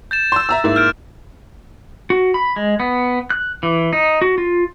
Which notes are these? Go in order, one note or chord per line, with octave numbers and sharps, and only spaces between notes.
G6 A6 E7
C6 E6
E5 A#5 E6
G#2 A#3 E4
F6 G6 D7
F#4
B5
G#3
B3
F#6
E3
D#4
F#4
F4